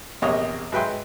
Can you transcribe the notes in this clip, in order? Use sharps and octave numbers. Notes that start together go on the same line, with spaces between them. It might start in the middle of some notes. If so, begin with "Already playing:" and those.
A#1 E2 C3 A#3 C#5 D#5
G#2 F#3 B4 E5 G5 C6